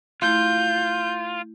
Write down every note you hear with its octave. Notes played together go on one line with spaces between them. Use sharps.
A3 E4 F4 G6